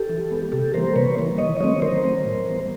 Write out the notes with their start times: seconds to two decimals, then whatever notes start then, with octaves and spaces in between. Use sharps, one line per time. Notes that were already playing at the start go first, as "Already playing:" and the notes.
Already playing: G4 A4
0.09 E3
0.31 G#3 B3
0.52 C3 G4 A4
0.74 E3 G3 A#3 A#4 C5
0.96 C3 B4 C#5
1.17 E3 G3 A#3
1.38 D#3 C#5 D#5
1.60 F#3 A3 C4 C#5 D#5
1.82 D#3 A#4 C5
2.03 F#3 A3 C4
2.25 A2
2.47 E3 G3 B3